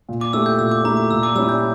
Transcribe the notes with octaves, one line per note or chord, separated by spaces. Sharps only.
A#2
D6
A3 E4 G4 E6
G6
A#2 E6
D6
A3 E4 G4 A#5
D6
A#2 E6
D6
G3 C#4 E4 E6
G6